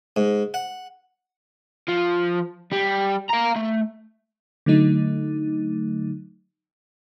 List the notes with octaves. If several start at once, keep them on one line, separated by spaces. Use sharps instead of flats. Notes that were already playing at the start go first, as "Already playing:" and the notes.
G#2
F#5
F3
G3
F5 A#5
A3
D3 F#3 A3 D#4